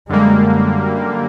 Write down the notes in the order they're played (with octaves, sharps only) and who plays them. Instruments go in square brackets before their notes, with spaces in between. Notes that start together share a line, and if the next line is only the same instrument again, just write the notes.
[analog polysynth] F#2 D3 G3 A#3 [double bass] G#3